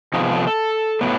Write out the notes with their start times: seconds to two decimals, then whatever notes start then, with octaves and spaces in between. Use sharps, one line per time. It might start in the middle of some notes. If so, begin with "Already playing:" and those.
0.14 C3 F3 G#3 B3 D#4
0.24 G#4
0.35 A4
0.47 A4
1.01 A2 F#3 B3